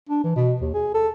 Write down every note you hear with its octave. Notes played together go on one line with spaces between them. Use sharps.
D4
E3
B2
D#2
G#4
A4